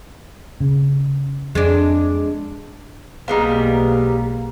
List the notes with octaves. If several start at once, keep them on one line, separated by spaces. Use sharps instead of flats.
C#3
F2 G#3 D4
B1 G3 G#3 A#3 B3 F5 A#5